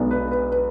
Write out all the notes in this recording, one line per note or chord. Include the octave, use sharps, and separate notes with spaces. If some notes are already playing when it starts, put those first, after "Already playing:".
Already playing: B1 B2 G#3 B3 D4
B4
B4
B4